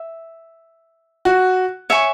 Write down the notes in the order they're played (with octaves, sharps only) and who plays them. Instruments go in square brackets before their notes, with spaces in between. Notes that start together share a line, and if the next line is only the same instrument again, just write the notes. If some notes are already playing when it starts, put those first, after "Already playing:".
Already playing: [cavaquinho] E5
[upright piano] F#4
[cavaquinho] C#5 E5 G#5 C#6